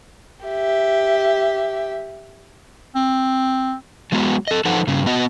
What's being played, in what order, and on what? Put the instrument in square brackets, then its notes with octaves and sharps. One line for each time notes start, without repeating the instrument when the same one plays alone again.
[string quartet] G4 E5
[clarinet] C4
[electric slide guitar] F#3 G#3 B3 F#4
A4 D#5
F3 D#4 A4 B4 C5 F#5
G2 C#3
B3 F#4 D#5